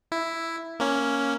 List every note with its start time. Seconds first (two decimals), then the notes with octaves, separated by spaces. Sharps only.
0.12 E4
0.80 A#3 C#4